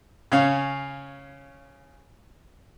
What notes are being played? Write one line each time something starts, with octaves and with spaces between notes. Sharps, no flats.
C#3 C#4 F5